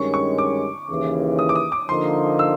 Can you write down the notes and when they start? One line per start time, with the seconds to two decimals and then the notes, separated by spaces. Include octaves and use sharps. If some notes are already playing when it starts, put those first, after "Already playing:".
Already playing: G2 D#3 G#3 C#4 C#6
0.14 C#6
0.38 D6
0.90 D#2 C#3 E3
1.39 D#6
1.49 D6
1.56 D#6
1.72 D6
1.89 D3 F3 A#3 D#4 C6
2.39 E6